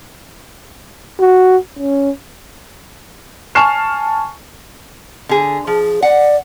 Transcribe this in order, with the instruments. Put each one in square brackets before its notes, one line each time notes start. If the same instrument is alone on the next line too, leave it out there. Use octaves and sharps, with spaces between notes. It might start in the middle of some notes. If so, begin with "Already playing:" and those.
[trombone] F#4
C#4
[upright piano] G#5 A5 C#6 F6 C7 E7
[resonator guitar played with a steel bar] D3 G#4
[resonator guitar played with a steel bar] F3 [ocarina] G#4
[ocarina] D5 [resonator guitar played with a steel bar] F#5